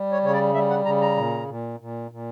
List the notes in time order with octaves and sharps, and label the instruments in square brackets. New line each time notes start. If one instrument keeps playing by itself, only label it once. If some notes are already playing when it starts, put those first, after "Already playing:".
Already playing: [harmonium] G3
C#5
C#3 C#5
D5
G3 E5
F#5
C#3 A#5
A#5
A#2
A#2
A#2
A#2